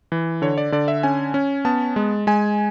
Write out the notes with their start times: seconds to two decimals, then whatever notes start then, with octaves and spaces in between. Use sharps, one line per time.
0.12 E3
0.42 D3 C#5
0.58 D5
0.72 D3 D5
0.88 E5
1.03 C#4 G#5
1.34 C#4
1.65 B3 A5
1.96 G#3
2.27 G#3 G#5